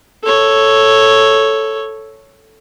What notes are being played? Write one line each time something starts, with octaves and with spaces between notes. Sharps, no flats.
A4 C#5